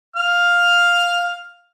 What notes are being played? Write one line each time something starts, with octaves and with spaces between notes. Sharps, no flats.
F5 F6